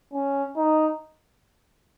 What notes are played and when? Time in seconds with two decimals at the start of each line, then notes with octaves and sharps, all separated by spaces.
0.13 C#4
0.56 D#4